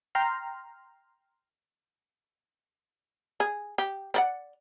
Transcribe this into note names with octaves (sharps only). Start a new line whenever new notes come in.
G5 A#5 C6 F6
G#4
G4
C4 D5 F#5